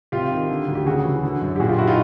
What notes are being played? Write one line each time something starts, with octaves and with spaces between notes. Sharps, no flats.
C3 F4 G4
D#3
D3
D2
G4
C#3 F#4 G#4
E3
D3
F#2
G4
A#2 F#4 G#4
F4 G4
E4 F#4
D#4 F4